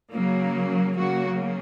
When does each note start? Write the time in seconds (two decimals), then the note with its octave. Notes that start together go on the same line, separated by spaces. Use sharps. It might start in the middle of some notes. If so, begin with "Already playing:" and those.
0.14 C#3 F#3 A#3
0.98 C#3 F#3 A#3 F#4